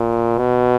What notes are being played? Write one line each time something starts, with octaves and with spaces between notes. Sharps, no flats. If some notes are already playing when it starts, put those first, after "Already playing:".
Already playing: A#2
B2